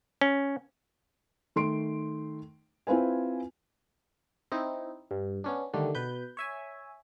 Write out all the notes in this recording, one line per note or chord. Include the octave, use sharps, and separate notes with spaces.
C#4
D#3 A3 C6 D7
C4 E4 F4 B4 G#5
C4 D#4 E4
G2
B3 C#4 D4
D3 D#3 G3 A3 D4
B2 B4 G6
C#5 E5 G#5